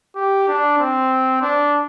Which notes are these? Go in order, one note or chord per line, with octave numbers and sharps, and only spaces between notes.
G4
D4
C4
D4